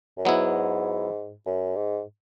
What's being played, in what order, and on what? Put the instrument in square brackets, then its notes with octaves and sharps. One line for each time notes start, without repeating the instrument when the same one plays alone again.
[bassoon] F#2
[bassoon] G#2 [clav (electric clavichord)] F#3 B3 E4
[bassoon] F#2
G#2